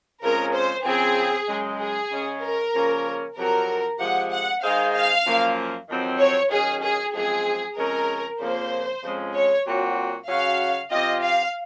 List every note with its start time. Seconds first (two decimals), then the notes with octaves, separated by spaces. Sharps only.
0.22 F2 C#3 F3 G#3 C#4 A#4
0.54 C5
0.85 C#3 F3 C4 G#4
1.48 F#2 C#3 G#3
1.80 G#4
2.11 C#3 G#3 C#4
2.42 A#4
2.74 C#3 F3 A#3 C#4
3.36 F2 C3 F#3 C4 F#4 A#4
3.99 C3 F3 G#3 F#5
4.31 F#5
4.62 D#3 G#3 D#4 G#4 C5 F5
4.94 F5
5.25 F#2 F3 A#3
5.89 F2 D#3 F#3 C4
6.19 C#5
6.50 D#3 F#3 C#4 G#4
6.82 G#4
7.14 F#2 F3 G#3 C4 G#4
7.77 F2 C#3 G#3 C#4 A#4
8.40 F2 C#3 F3 A#3 C5
9.03 F2 C#3 F3 G#3 C#4
9.34 C#5
9.66 A#2 F#3 C4 F#4
10.28 C#3 F#3 C#4 F#4 F5
10.91 C3 F3 C4 F4 D#5
11.22 F5